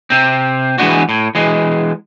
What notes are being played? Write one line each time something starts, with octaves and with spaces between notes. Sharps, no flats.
C3 C4
E3 G#3 A3 B3 D4 F#4
A2
E3 G#3